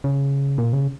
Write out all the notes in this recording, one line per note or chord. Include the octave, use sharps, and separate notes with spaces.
C#3
A#2
C#3